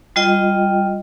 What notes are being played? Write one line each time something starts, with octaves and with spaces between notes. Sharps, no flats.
G3 F4 D#5 G5